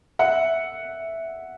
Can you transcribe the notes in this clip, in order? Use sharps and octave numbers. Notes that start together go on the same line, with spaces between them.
E5 F#5